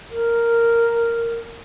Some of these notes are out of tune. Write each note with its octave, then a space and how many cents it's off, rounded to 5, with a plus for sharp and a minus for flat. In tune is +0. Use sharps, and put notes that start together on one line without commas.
A#4 -5